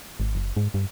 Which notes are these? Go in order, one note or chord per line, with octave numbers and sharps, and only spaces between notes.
G#1
F#1
G#2
G2